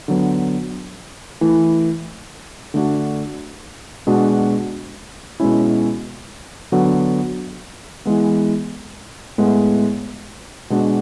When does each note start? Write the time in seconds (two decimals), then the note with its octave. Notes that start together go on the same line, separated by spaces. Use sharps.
0.08 D3 F#3 B3
1.41 E3 A3 E4
2.74 D3 A3 D4 F#4
4.07 B2 G#3 D4 F#4
5.40 B2 G#3 C#4 E4
6.72 D3 F#3 B3 F#4
8.06 E3 G#3 B3
9.38 A2 G#3 B3 E4
10.70 B2 G#3 D4 F#4